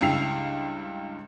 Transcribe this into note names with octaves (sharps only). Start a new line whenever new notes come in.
C#2 G2 E4 G5 C7 F7